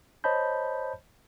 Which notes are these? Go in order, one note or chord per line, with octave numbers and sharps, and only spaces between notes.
C5 C#5 D#5 A5 B5 G6